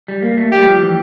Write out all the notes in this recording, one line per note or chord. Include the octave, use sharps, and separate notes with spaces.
G3
A#3
A3
G3 G4
F3
E3